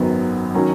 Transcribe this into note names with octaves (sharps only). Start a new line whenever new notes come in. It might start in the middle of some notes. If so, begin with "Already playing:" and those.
Already playing: G#1 F#2 D#3 F#3 B3
D#3 F#3 C#4